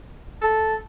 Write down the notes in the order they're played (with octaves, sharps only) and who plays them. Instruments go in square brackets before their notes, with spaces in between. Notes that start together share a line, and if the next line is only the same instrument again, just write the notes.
[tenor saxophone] A4